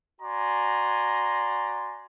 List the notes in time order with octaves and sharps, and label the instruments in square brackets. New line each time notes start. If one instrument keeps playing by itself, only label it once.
[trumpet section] F#4 D5 G#5 A#5 C6